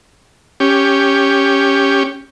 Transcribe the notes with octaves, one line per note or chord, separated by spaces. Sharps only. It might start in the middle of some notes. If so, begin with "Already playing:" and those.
C#4 G4